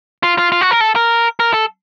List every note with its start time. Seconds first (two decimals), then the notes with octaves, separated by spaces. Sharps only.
0.23 F4
0.38 F4
0.52 F4
0.61 F#4
0.71 A#4
0.81 A4
0.96 A#4
1.40 A#4
1.54 A4